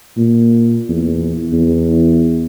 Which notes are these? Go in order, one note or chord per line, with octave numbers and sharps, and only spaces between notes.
A#2
E2
E2